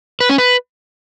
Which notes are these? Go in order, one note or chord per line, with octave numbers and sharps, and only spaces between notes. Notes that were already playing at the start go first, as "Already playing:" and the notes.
B4
C#4
B4